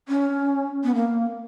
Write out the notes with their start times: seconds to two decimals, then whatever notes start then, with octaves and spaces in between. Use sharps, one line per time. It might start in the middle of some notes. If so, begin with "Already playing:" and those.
0.09 C#4
0.84 B3
0.95 A#3